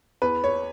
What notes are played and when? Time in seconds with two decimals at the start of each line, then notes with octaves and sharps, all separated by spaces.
0.22 E2 B4
0.44 C#5